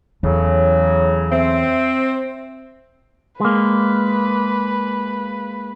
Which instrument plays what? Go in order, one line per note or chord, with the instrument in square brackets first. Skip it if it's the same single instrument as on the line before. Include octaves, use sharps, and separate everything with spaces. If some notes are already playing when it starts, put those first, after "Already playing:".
[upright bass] E2 [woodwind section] A2 C#3 F#3
[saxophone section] C4 [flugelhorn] E5
[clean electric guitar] G#3 A#3 [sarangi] B4